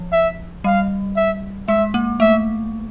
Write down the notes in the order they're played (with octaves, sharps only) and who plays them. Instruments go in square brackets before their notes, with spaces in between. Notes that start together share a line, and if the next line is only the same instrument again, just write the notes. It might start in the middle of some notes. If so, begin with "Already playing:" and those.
Already playing: [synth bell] F3
[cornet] E5
[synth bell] G3 [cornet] F5
[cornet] E5
[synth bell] G#3 [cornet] E5
[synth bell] A#3
[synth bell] A3 [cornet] E5